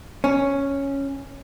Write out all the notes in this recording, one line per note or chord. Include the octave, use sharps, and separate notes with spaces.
C#4